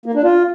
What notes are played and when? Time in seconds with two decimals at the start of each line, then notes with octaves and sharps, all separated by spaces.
0.06 A#3
0.15 D4
0.24 F4